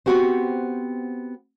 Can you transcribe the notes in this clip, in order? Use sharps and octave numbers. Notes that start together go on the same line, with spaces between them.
B3 C4 F#4 G4 C5